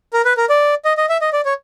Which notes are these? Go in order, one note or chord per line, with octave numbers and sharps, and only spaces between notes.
A#4
B4
A#4
D5
D#5
D#5
E5
D#5
D5
C#5